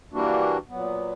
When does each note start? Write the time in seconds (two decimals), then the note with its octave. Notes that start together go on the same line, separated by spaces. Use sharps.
0.11 E3 G3 A#3 D4 F#4
0.69 A#2 F#3 B3